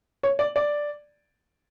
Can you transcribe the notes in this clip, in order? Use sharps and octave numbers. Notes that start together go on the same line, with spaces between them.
C#5
D5
D5